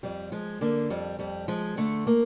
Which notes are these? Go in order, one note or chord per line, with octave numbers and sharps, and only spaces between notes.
F2 G3
F3 G#3
D3 A#3
F2 G3
F2 G3
F3 G#3
D3 A3
A#3